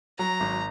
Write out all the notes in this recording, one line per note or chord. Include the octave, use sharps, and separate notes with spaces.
F#3 A#5
G#1